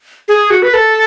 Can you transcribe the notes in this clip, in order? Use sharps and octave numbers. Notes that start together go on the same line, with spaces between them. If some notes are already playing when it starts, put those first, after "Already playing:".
G#4
F#4
B4
A4